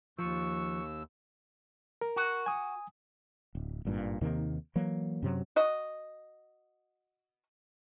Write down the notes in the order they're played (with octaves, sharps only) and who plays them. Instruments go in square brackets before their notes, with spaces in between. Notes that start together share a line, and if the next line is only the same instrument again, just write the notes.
[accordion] D#2 E6 [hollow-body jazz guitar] F3 [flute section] C#6 F#6
[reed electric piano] A#4
[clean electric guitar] F#4
[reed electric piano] G#5 D#6
[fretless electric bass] D1
G#1 G2 A#2
D#2 C3 D#3 A#3
E3 F#3 A#3
F#2 C3 F#3
[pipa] F#4 D#5